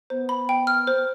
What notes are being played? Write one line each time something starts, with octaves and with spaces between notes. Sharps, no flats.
B3 C5
B5
G5
F6
C5